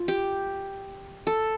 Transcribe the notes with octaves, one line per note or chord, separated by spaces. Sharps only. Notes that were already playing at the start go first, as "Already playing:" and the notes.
Already playing: F4
G4
A4